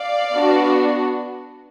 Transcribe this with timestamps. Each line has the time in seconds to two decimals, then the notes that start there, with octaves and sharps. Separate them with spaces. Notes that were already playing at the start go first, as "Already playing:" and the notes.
Already playing: D5 F5
0.32 B3 D4 F#4